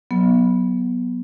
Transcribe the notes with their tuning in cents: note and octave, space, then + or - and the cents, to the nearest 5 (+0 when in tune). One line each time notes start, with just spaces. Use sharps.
F#3 +0 B3 -15